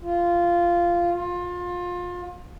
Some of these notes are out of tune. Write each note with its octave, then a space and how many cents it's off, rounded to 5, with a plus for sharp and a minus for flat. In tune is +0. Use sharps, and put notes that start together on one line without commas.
F4 -10
F4 +25